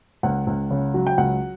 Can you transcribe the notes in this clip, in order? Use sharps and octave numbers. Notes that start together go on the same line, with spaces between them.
C#2 F#5
C#2
C#3
F#3
G5
C#2 F#5